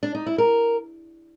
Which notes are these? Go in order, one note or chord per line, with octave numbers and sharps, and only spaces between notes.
D4
D#4
E4
A#4